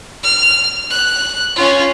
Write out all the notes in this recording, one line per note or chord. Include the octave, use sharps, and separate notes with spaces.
F6
F#6
C#4 F4